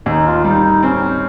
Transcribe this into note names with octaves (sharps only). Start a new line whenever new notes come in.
D#2 D#4
F4
G3 D#4
D#4
C4 C#4